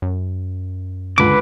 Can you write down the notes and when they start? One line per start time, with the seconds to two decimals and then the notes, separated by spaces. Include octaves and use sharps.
0.02 F#2
1.18 C#2 D3 B4 D6